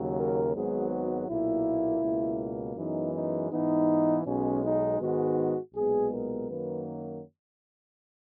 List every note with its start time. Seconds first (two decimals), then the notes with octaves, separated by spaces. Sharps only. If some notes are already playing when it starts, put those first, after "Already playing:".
Already playing: D#2 C#3 F#3
0.16 A#4
0.54 G#1 G#2 F#3 B3 G#4
0.91 F#4
1.28 B1 A#2 A#3 E4
2.02 C#2 B2 A#3
2.76 F#2 E3 G#3 B3 D#4
3.13 D#4
3.51 G#2 E3 B3 D#4
4.26 B1 B2 G#3 C#4
4.63 D#4
4.99 G#2 D#3 G#3 B3 F#4
5.74 B1 A#2 G#3 B3 G#4
6.11 A#4
6.48 F#2 D#3 F#3 A#3 B4